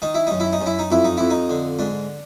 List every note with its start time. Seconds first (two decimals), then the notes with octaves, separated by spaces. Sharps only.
0.02 D#3 D#4
0.15 E4
0.27 F#2 D#4
0.40 E4
0.53 D#4
0.61 F#2
0.66 E4
0.79 D#4
0.91 F2 E4
1.04 D#4
1.17 F2 E4
1.30 D#4
1.50 D3
1.79 G#2 D4